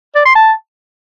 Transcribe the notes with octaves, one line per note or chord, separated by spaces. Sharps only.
D5
C6
A5